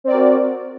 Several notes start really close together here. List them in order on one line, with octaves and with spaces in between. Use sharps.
C4 D5 A#4 F#4